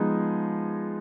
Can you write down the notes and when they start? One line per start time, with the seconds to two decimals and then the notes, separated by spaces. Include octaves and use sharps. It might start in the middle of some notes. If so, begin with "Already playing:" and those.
Already playing: F3 G#3 B3 D#4 G#4